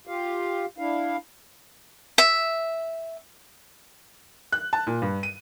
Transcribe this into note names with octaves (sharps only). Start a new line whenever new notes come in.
F4 G4 F5
D4 E4 F5
E5
F#6
A5
A#2
G2
D#7